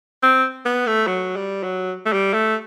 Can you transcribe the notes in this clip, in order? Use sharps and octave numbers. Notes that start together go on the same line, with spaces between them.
C4
B3
A3
F#3
G3
F#3
A3
G3
A3